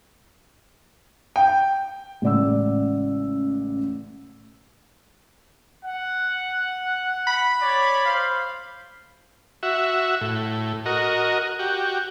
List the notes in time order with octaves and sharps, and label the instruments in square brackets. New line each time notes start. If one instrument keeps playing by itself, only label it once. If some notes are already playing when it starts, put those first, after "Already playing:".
[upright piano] G5
[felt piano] A1 C#3 G#3 D5 F#5 E6
[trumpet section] F#5
[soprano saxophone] B5
[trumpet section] C#5 D5
C5 F5
[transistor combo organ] F#4 E5
A2
F#4 A#4 D#5
F#4 G4